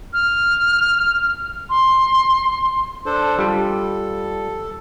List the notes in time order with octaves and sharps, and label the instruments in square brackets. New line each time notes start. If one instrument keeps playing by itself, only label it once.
[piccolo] F6
C6
[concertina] D4 A4 C5
[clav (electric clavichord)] G3 F4 [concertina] A4